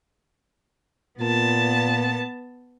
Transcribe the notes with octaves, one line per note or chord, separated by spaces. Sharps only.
A#2 B3 A5